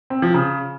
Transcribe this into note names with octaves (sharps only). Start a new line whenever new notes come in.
C4
F3
C#3